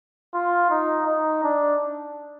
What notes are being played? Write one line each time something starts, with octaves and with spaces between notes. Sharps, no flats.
F4
D#4
D#4
D4